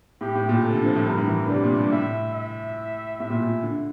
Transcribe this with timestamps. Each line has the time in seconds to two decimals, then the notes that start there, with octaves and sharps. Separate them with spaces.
0.21 A2 G4
0.35 A2
0.49 A#2
0.64 C3 A4
0.74 D3
0.85 F3
0.95 A2
1.06 G2 A#4
1.17 A2
1.27 E3
1.39 D3
1.49 C3 D5
1.64 A#2
1.77 G2
1.92 A2 E5
2.34 E5
3.20 A2 E5
3.30 A#2
3.41 A#2
3.63 D3